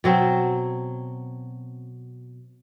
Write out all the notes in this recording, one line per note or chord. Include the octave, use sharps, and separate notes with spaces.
B2 F#3 C4